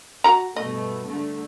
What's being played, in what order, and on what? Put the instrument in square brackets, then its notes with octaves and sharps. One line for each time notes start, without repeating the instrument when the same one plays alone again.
[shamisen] F#4 A#5
[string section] G2 B2 A3 [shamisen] D#5
[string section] D3 A3